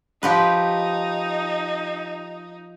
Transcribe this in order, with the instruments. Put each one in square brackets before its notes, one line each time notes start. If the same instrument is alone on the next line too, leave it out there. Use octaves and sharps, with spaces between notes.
[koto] F3 G4 B4 [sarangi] D#4